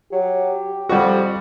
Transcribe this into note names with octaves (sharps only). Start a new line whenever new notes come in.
F#3 G4
F2 G3 F#4